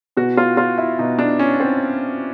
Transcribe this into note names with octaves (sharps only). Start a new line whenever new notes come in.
B2 F#4
F4
F4
E4
B2 D#4
D4
C#4
C4